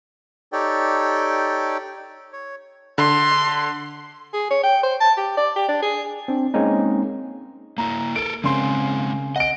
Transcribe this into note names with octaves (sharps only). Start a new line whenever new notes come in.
D#4 G4 A4 C#5 D5 G5
C#5
D3 C6
G#4
C#5
G5
C5
A5
G4
D5
G4
D4
G#4
C4 D4
G#3 A#3 C4 C#4 D#4
A#3 E4 A#5
A4 A#4 D7
C#3 G#3 A#3 C4 C6
D#5 F#5 D7